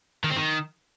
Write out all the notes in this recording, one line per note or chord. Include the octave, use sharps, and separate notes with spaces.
D#3
C4
D#3